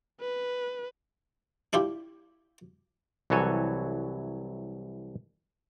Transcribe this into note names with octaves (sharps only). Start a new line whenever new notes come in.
B4
D4 E4 F4 G4
C2 E3 F#3 A4 C#5 G#5